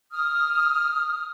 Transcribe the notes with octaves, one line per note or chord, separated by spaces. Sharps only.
D#6 F6